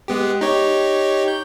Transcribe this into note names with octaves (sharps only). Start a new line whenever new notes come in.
G#3 B3 G4
D#4 G4 C#5
G6